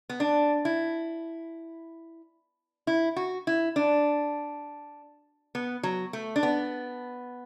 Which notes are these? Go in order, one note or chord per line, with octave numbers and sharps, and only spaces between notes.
B3
D4
E4
E4
F#4
E4
D4
B3
F#3
A3
D4
B3